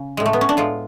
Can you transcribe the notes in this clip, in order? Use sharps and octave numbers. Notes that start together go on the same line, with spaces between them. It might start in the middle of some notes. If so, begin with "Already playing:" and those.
Already playing: C#3
A2 G#3
A3
B3
C#4
D4
A2 G#3 F4